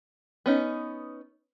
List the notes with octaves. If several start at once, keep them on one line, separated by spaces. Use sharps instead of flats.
B3 C#4 D#4